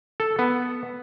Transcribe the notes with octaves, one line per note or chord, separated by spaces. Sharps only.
A4
B3